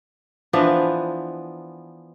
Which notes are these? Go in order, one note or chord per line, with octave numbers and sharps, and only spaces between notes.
E3 F3 B3 D4